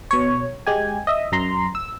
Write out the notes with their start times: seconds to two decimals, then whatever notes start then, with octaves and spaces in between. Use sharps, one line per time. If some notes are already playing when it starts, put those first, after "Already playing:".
0.11 B2 C#5
0.66 G#3 G4 G#5
1.07 D#5 E5
1.32 F#2 A#5 C6
1.75 E6